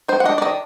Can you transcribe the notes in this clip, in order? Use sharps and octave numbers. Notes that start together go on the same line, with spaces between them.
D#3 C5
F#5
D4 D#5
D5
D#3 D#5